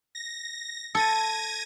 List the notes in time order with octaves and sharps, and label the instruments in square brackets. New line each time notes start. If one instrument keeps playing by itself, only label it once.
[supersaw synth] A#6
[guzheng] A4 [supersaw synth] G#6 A#6 D#7